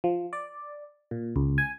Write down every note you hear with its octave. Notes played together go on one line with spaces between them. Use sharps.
F3
D5
A#2
C#2
G#5